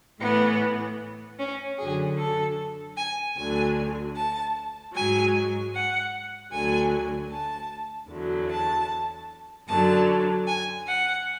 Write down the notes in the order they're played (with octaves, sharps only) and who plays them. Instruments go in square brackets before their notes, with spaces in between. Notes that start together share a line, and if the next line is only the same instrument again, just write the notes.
[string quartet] A2 E3 B3
C#4
F#2 D3 F#3 G#4
A4
G#5
D2 D3 F#3 G#5
A5
G#2 F#3 G#5
F#5
D2 D3 F#3 G#5
A5
E2 D3 F#3
A5
F#2 D3 F#3 A5
G#5
F#5